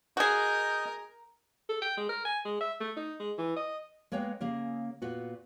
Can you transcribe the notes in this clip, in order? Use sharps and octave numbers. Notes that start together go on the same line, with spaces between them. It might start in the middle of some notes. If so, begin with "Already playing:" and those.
F#4 G#4 A#4 D#5 G6
A4
G5
G#3
A#4
G#5
G#3
E5
A3
D#4
G#3
E3
D#5
G#3 A#3 B3 C#5 G5
C#3 A#3 G#4
A#2 B3 F#4